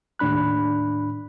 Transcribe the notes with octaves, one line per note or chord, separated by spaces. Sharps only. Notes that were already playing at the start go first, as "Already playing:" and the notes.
D#2 A2 D4 B5 F#6